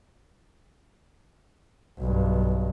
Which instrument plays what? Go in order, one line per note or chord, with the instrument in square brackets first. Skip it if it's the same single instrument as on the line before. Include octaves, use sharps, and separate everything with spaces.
[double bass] B1 G2